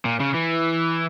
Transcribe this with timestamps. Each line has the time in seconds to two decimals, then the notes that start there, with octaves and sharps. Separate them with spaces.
0.05 A#2
0.20 C#3
0.34 E3